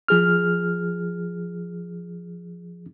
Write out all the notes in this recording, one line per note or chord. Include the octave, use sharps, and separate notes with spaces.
F3 G#4 F6